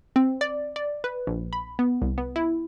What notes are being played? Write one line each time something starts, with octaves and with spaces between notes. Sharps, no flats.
C4
D5
D5
B4
A#1
B5
B3
C2
B3
E4